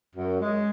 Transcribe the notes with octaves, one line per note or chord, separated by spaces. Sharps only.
F#2
G#3